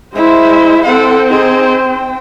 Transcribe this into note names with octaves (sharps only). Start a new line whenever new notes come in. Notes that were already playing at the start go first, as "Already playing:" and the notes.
G#3 E4 C5 E5
C4 A4 C5 F#5
D#4 G#4
G5